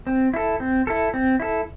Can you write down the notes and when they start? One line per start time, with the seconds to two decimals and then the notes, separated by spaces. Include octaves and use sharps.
0.07 C4
0.34 E4 A4
0.60 C4
0.87 E4 A4
1.14 C4
1.40 E4 A4